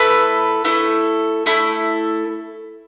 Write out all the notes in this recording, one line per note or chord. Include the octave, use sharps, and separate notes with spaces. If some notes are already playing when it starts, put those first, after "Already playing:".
Already playing: A3 E4 A4 B4
A3 E4 A4
A3 E4 A4